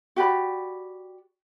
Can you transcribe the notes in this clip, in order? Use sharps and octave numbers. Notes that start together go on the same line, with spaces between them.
F#4 G4 D5 B5